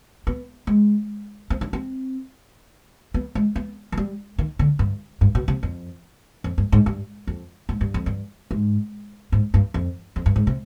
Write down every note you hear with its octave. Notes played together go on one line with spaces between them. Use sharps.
B3
G#3
C4
D4
C4
B3
G#3
B3
F3
G3
D#3
D3
G2
G2
B2
C3
F2
F2
G2
G#2
G2
F2
G#2
G2
F2
G2
G#2
G#2
G2
F2
F2
G2
G#2
C3